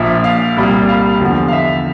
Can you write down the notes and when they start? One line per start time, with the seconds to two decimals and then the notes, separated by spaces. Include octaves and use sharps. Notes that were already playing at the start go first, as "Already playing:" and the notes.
Already playing: A#1 A#2 F3 E5
0.24 F5
0.57 C2 A#2 G3
0.89 F5
1.21 E2 D3 F3
1.48 F5
1.53 E5